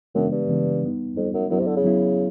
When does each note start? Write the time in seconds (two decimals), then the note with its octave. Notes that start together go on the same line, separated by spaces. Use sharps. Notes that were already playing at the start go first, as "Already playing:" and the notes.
0.15 F#2 C#3 E3 G#3 B3 D4
0.32 G2
0.49 C#3 E3 G#3 B3 D4
0.82 G3 B3 D#4
1.16 F2 G3 B3 D#4
1.34 F#2
1.50 F#2 F#3 B3 E4
1.59 C3
1.67 D3
1.77 C#3
1.84 F#3 B3 E4